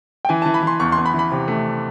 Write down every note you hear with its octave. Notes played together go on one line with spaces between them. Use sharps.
G5
E3 G#5
E3 A5
B5
E3 C6
E2 C#6
E2 C6
B5
E3
B5
C3
A3